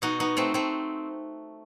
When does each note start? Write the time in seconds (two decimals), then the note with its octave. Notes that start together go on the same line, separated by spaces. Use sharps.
0.02 B2 D#4 F#4
0.20 B3 D#4
0.37 A3 C4
0.54 A3 C4